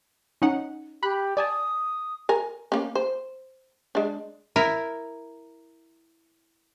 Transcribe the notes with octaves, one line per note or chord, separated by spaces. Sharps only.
C#4 D#4 F#5
G4 B5 F#6
D5 G#5 A5 D#6
A#4 G#5
A#3 C#4
C5
G#3 D4
E4 A#4